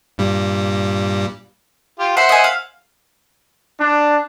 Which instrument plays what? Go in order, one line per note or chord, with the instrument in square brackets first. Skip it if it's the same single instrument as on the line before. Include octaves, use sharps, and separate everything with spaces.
[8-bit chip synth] G2 A#2 G3
[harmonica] F4 G4
[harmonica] C5 E5 F#5 [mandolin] C6
[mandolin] D#5 G#5
F5
[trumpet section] D4